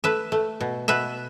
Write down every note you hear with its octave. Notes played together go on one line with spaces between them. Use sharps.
A3 B4 E5
A3
B2
B2 B4 E5